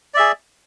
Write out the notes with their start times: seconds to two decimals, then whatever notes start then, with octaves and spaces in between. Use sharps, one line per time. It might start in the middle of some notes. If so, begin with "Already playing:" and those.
0.14 D5
0.17 E5
0.20 G#4